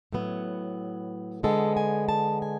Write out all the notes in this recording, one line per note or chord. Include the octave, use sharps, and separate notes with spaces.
A2 F#3 B3
D3 G#3 B3 A4
G#5
A5
G#5